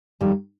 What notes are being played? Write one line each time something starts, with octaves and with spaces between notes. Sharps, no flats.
F2 D#3 G3